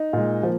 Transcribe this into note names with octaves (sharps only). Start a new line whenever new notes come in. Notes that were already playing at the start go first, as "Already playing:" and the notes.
Already playing: D#4
A#2 G#3
F3 A#3